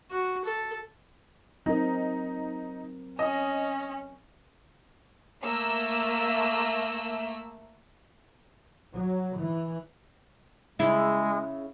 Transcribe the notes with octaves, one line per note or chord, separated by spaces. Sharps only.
F#4
A4
F#3 C4 D#4 A#4
C#4 D#5
A3 A#3 E6
F#3
E3
C#3 G#3 E4